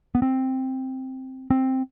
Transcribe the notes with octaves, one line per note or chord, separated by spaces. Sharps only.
B3
C4
C4